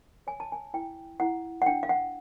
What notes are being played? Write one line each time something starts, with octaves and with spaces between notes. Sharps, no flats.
C#5 G#5
A5
G#5
E4 G5
E4 F#5
F#5
D4 G5
F5
F#5